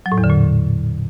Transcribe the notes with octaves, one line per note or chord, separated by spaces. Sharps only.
F#3
A2
E2
D3
A#2